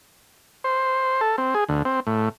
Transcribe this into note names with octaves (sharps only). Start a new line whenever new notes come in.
C5
A4
C4
G#4
D2
C4
A2